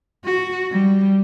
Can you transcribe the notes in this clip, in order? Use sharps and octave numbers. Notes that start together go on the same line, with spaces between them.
F#4
G3